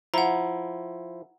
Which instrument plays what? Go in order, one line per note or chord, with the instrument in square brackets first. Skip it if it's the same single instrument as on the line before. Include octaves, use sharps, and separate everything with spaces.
[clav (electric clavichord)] F3 E4 [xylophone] F#5 A#5